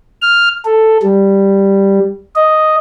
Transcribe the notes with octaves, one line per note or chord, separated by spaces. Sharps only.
F6
A4
G3
D#5